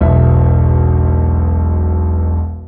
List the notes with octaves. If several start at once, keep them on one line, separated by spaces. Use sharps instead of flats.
E1 B1 E5